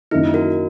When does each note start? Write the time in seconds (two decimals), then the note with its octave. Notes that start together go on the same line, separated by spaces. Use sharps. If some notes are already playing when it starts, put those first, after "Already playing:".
0.11 F#2 D#3 A#3 D#4 E4
0.34 F#4 A#4